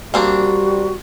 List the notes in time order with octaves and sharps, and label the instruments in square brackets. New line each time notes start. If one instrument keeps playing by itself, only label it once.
[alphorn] G3 [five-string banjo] A#3 C4 D4 [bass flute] F#4